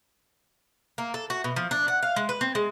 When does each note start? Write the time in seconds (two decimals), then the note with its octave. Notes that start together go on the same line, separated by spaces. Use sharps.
0.98 A#3
1.14 A4
1.30 F#4
1.44 B2
1.56 F3
1.71 D4
1.88 F#5
2.03 F5
2.16 G#3
2.29 B4
2.41 C4
2.55 G#3